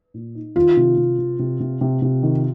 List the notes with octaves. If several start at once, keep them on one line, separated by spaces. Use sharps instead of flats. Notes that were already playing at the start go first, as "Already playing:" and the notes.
A#2
D#4
D#3 F4
C3
C3
C3
C3
C3
C3
C3
D#3